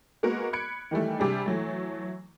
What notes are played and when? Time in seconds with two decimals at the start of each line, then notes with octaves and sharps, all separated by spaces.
0.23 G#3 A#3 B3 F#4 A#4
0.53 B5 F#6 G#6 C#7 D7
0.91 D#3 E3 G3 A3
1.19 C3 G3 D4 G#4
1.46 E3 F#3 A3